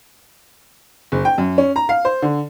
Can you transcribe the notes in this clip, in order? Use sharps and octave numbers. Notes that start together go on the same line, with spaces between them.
F#1
G5
F#2
C#4
A#5
F5
C5
D3